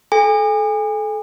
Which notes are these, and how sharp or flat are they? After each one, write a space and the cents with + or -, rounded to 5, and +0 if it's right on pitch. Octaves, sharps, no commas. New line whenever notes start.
A4 -30 G#5 -30